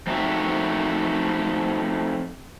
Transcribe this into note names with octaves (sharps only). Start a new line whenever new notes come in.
F3 A3 C4 D#4 F#4 E5